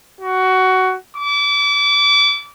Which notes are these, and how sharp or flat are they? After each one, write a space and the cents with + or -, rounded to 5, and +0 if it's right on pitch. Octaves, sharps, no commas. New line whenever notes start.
F#4 +15
D6 -30